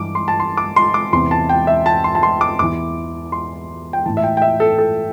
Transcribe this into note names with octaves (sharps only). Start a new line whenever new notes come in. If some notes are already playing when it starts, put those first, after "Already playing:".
Already playing: G2 E3 D6
C6
A5
C6
D6
C6
D6
E2 C3 E3 C6
A5
G5
E5
A5
C6
A5
C6
D6
E2 E3 D6
C6
G5
A2 E3 A5
E5
G5
G5
E5
A4
A4